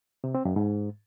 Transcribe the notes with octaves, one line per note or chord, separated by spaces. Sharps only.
C3
C4
F#2
G#2